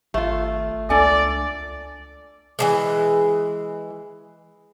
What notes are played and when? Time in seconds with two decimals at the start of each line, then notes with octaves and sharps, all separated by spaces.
0.14 G#1 A3 F4
0.90 C#2 D4 A4 D5 G#5
2.59 E3 F3 G#3